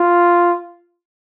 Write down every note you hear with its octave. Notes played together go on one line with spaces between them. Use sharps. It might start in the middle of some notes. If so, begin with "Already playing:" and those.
Already playing: F4